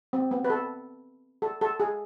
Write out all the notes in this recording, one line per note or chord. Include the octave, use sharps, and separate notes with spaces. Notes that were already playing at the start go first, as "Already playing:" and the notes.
C4
B3
B4
A4
A4
A4
G#4